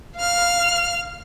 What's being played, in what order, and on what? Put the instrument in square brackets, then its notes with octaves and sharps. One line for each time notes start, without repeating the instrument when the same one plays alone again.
[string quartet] F5 F6